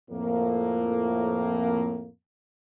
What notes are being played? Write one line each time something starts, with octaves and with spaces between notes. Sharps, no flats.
F2 A2 A#3